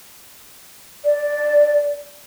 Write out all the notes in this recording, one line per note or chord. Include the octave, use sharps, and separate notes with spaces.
D5